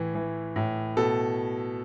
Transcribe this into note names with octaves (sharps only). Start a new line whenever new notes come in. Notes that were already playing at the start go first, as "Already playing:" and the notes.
Already playing: A2 E3
E3
A2
B2 A4